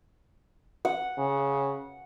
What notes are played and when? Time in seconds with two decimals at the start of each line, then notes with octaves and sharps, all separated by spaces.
0.85 F#5
1.18 C#3